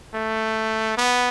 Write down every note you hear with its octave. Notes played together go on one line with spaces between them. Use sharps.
A3
B3